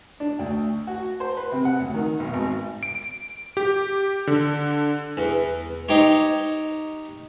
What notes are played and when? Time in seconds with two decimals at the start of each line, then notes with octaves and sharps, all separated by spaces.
0.20 D4
0.39 D2
0.87 F#4
1.20 C5
1.37 B4
1.52 C3
1.65 F#5
1.80 D2
1.94 D#3
2.19 B1
2.33 G#1
2.83 D7
3.57 G4
4.27 D3
5.17 E2
5.89 D#4 G4 C5 C#5